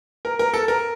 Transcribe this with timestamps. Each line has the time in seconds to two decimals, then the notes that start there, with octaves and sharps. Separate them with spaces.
0.25 A#4
0.39 A#4
0.54 A4
0.68 A#4